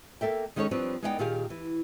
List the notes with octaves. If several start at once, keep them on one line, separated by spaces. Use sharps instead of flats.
A#3 A4 E5 G5
D#3 G#3 C#4 D#4 A4 C#5
F3 G3 C4 D4 B4 C#5
G#3 B3 D#4 D5 E5 G5
A#2 D#3 G4 G#4 F5
E3